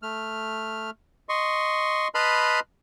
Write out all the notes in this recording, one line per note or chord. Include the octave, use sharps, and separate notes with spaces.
A3 F6
D#5 C6 C#6
B4 D#5 A5 B5 C6 F6